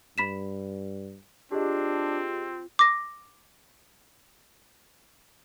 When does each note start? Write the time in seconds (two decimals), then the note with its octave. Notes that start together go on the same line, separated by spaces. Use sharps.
0.18 G2 B5 B6 E7
1.52 C4 D4 F4 G4 G#4 D#5
2.79 D6 A#6